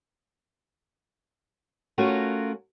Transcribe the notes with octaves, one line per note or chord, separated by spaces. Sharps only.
A3 C#4 F4 F#4 A#4